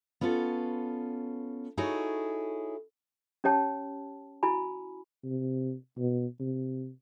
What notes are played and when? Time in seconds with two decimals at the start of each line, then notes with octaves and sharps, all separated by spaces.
0.21 B3 C#4 F4 A4
1.77 D#4 E4 F#4 G#4 A4 C#5
3.44 C#4 G4 C#5 G5 A5
4.43 E4 F#4 G#5 B5
5.24 C3
5.98 B2
6.40 C3